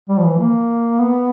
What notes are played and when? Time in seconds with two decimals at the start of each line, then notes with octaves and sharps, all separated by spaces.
0.09 G3
0.18 F3
0.24 E3
0.40 A#3
1.00 B3